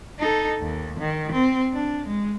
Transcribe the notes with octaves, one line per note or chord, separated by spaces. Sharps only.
D#4 A4
D#2
D#3
C4
D4
G#3